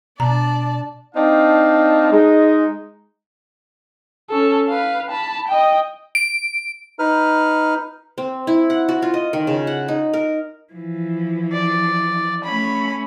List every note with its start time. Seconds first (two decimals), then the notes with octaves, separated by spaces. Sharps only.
0.20 B2 D4 D5 A5 A#5
1.15 C4 D4 D#4 D5 F5 A5
2.11 G#3 D#4
4.30 C#4 A4
4.68 B4 F5
5.10 A5 B5
5.48 D#5 G5
6.15 D7
6.99 D#4 B4 F6
8.18 C4
8.47 E4
8.70 F#5
8.88 F#4
9.02 F4
9.14 D#5
9.33 D#3
9.47 C#3
9.67 F#5
9.88 D#4
10.13 A#4
10.73 E3 F3
11.52 D5
12.44 A3 C#4 B5